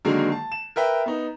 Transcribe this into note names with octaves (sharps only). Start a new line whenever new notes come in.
D3 D#3 F#3 G#3 A#3
A5
E7
A#4 B4 E5 G5
B3 D#4